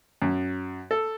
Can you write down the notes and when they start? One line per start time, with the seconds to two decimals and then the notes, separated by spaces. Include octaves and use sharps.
0.22 F#2
0.91 A4